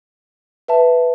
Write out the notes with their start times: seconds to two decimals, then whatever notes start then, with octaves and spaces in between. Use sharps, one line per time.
0.68 B4 E5 A5